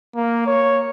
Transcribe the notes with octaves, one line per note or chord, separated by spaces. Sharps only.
A#3
C#5